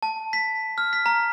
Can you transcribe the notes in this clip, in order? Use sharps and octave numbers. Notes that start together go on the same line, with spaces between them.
A5
B6
F6
B6
A#5